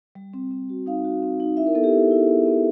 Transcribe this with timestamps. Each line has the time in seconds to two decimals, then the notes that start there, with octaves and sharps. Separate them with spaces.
0.15 G3
0.34 C4
0.51 C4
0.69 F#4
0.86 D#4 F5
1.04 F#4
1.23 C4
1.40 D#4
1.57 E4 E5
1.67 A#4
1.75 B3 A4
1.84 G4
1.92 E4 G#4
2.11 E4
2.29 B3
2.46 B3